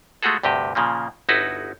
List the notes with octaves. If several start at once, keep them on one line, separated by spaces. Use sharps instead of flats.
G#3 A3 F4 F#4 G#4 A4
D2 G2 C3 G4 D#5
A#2 C#3 F3 A#3
G1 D#4 E4 F#4 A4 B4